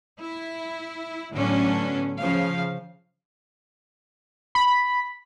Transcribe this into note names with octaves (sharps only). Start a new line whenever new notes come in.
E4
A2 D3 F#3 B3 C#4 D4
C#3 F3 F5
B5